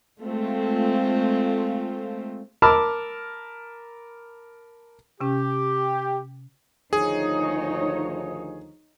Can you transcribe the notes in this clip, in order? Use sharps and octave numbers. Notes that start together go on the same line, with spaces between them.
G#3 A3 C4 F4
A#4 A5 B5 D6 E6 F6
C3 C#4 G4
D2 D#3 F3 D#4 G#4 C#5